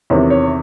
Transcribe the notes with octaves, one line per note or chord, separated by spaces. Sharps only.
E2 C3 D#3 C#5
C#5